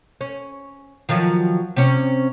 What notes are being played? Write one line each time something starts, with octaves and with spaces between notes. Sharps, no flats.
C#4
D#3 F3 F#3
C3 C#4